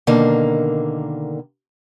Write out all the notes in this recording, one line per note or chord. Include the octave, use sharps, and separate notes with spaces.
B2 D3 D#3 A#3